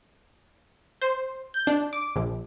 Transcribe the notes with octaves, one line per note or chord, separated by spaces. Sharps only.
C5
G6
D4
D6
A#1